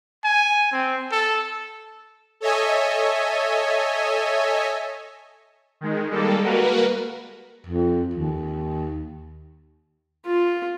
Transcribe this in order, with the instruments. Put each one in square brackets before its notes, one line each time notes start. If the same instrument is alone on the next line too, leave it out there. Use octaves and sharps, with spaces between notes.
[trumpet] G#5
C4
A4
[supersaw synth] A4 C#5 D#5 E5 G#5
D#3 G#3
G3 G#3 A#3 A4
A#3 F#4 A#4 B4
[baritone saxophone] F2
D#2
[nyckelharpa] F4